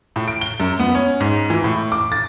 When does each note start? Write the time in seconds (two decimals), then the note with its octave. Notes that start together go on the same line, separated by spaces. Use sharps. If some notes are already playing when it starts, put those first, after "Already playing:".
0.16 A2
0.28 D7
0.41 G7
0.60 F#2
0.79 B3
0.95 C#4
1.20 G#2
1.50 E3
1.64 A2
1.92 D6
2.12 A6